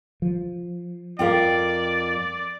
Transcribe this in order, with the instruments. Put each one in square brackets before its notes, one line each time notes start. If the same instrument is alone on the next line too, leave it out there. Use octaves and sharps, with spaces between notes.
[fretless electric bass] F3
[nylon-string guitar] F2 F4 A#4 [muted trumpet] D5 [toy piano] F5 G5